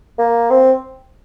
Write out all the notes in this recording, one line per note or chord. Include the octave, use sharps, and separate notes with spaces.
A#3
C4